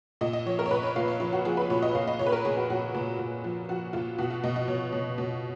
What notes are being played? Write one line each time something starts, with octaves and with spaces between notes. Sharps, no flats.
A#2 D#5
D#5
F3 C#5
A#4
C#5
A#2 B4
C#5
A#2 F5
C#5
F3 F4
F#4
F3 G#4
B4
A#2 C#5
D#5
A#2 F5
D#5
A#2 C#5
B4
A#4
A#2 G#4
F#4
A#2 F#4
A#2
A#2
F3
F3 F#4
A#2 F4
B2 F#4
F4
B2 D#5
D#5
B2 C#5
B2
B2